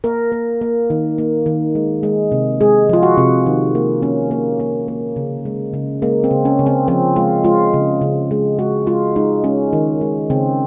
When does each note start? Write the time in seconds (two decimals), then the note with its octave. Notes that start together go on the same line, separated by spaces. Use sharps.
0.04 A#3 A#4
0.32 A#3
0.61 A#3
0.90 D#3
1.18 A#3
1.46 D#3
1.75 G#3
2.03 G#3
2.32 C3
2.61 G#3 G#4
2.89 F3 F4
3.03 F#4
3.18 C3
3.46 D#3
3.75 A#3
4.02 A#3 C#4
4.31 A#3
4.60 A#3
4.88 A#3
5.16 C#3
5.45 G#3
5.74 C#3
6.02 G#3 A#3
6.24 C4
6.31 C#3
6.45 C#4
6.59 C#3
6.66 C4
6.88 F3 C4
7.16 G#3 F4
7.44 G#3 F4
7.74 C#3
8.01 C#3
8.31 G#3
8.59 G#3 F#4
8.87 G#3 F4
9.16 G#3 D#4
9.44 G#3 C#4
9.73 D#3
10.01 G#3
10.30 C#3 C4